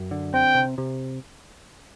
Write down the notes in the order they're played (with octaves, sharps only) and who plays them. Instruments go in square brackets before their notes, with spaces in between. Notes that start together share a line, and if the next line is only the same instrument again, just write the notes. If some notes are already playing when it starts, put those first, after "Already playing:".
Already playing: [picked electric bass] F#2
D3
[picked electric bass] C4 [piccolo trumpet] G5
[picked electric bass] C3
C3